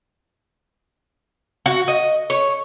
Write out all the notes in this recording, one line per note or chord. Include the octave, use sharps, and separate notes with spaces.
F#4
D#5
C#5